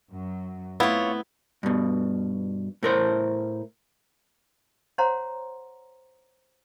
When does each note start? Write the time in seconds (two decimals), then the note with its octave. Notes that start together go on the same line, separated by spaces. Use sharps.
0.11 F#2 F#3
0.80 A3 B3 C4 E4 F4 C#5
1.63 G2 B2
2.83 A2 A#4 C5
4.98 C5 C#5 F#5 A#5 C6